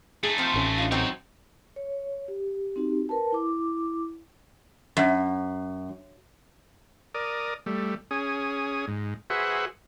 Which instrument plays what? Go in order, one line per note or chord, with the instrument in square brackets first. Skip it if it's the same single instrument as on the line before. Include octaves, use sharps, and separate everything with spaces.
[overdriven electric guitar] A3 D#4 [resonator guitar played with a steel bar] G#4
[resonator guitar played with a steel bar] F3 C4
[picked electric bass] A1 C#4
[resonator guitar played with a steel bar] D4 F4
[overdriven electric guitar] F#2 C#5 [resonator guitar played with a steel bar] F#3 C4 D#4
[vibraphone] C#5
G4
C4 D#4 F#4 G4
A#4 B4 A5
E4 D6
[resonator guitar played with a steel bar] F#2
[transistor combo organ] A#4 D5 D#6
G3 A3
C#4 G#4 D#6
G#2
F#4 G#4 B4 C5 E5 F#5